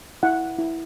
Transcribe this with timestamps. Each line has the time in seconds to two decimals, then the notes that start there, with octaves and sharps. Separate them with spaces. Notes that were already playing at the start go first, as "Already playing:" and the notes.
0.23 E4 F#5
0.58 E4